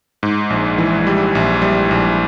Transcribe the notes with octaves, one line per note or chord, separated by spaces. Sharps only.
G#2
A#1
E3
G3
A#1
G3
A#1